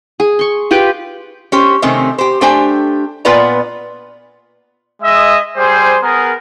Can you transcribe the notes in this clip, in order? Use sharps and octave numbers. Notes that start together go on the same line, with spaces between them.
G#4
C6 C#6
F4 G4 B4 G5
C#4 G4 C5
C3 D#3 A3 C4 C#4
G4 C5
A3 D4 G4 C5 G5 G#5
A#2 B3 F4 B4 D5 A#5
G#3 D#5 E5
G3 G#4 C5
B3 G#4 A#4